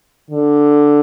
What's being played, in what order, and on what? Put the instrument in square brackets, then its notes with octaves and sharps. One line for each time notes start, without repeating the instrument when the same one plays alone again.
[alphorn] D3